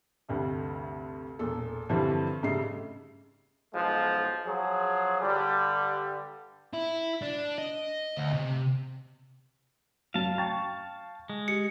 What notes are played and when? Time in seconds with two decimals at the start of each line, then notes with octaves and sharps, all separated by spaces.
0.29 D2 G2 C3
1.39 E1 A#2 A4
1.89 G2 D3 E3 F3 G3 C4
2.43 G#2 C#3 G3 A3 C7
3.73 B1 F3 G#3
4.45 F3 F#3 G#4
5.22 G2 D3 G3
6.74 E4
7.22 D4
7.58 D#5
8.17 D2
8.33 C3
10.14 F#2 F#3 F5 A5
10.38 G5 C#6 A6
11.30 G#3
11.48 G4 C#7